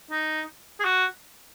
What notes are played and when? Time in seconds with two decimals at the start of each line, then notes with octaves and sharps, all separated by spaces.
0.11 D#4
0.80 G#4
0.84 F#4